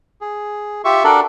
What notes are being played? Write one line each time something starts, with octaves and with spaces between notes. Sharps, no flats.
G#4
F4 G4 E5 C#6
D4 F#4 A4 A#4 D5